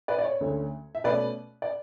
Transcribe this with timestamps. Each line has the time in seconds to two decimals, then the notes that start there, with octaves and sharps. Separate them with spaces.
0.08 B4 D5
0.18 D5
0.24 C#5
0.41 D2 D3 A3 C#4
0.95 E5
1.04 B2 A3 C#4 B4 D5
1.62 D5